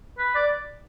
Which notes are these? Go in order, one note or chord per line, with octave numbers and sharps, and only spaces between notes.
B4
D5